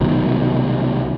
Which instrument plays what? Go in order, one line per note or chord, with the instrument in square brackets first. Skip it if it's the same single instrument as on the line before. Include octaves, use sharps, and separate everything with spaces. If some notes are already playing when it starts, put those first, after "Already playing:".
[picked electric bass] C2 B2 D#3 F#3